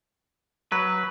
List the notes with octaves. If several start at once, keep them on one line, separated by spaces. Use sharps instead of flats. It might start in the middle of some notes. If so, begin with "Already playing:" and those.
F#3 B4